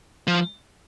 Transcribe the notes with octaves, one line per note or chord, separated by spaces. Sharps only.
F3